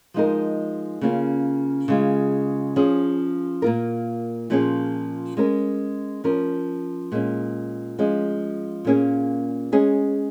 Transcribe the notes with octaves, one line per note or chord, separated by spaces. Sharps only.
F3 G#3 D#4 A#4
C#3 A#3 C#4 F4
C#3 G#3 F4
F3 C#4 G#4
A#2 A#3 F4 A#4
A#2 F3 C#4 G#4
G#3 C#4 A#4
F3 C#4 A#4
A#2 G#3 C#4
F3 G#3 C#4
A#2 A#3 C#4 G#4
G#3 C#4 G#4